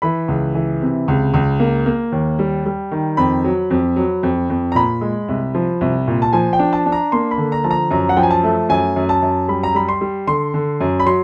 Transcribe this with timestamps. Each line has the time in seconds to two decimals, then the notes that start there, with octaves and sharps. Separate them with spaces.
0.02 E3 B5
0.28 C#2
0.55 E3
0.82 C3
1.08 C#2
1.34 C#2
1.60 A#3
1.86 A#3
2.12 D#2
2.39 G3
2.66 G3
2.91 D#3
3.17 F2 B5
3.44 F#3
3.70 F2
3.96 F#3
4.23 F2
4.50 F2
4.72 A#5
4.75 A#2 B5
5.01 G#3
5.28 C2
5.55 F3
5.81 C2
6.08 A#2
6.22 A5
6.33 F3 G#5
6.53 G5
6.59 D4
6.73 A5
6.86 D4
6.92 A#5
7.12 A#3 C6
7.31 B5
7.38 D3
7.52 A#5
7.64 F3 A5
7.71 A#5
7.91 F#2 A#5
8.09 F#5
8.17 F3 G5
8.23 G#5
8.31 A5
8.43 A3
8.69 F#2 G#5
8.96 F#2
9.09 A5
9.22 F#2
9.48 G3 B5
9.63 A#5
9.75 G3 B5
9.89 C6
10.01 G3
10.27 D3 C6
10.54 D3
10.81 F#2
11.00 B5
11.06 F#3 C6